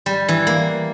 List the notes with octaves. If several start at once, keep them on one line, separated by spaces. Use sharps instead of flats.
G3
E3
A#3